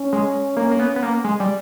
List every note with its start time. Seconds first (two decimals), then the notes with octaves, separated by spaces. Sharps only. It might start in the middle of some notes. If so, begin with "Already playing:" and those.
Already playing: C#4
0.13 G#3
0.57 A#3
0.71 A#3
0.79 B3
0.96 B3
1.03 A#3
1.24 G#3
1.40 G3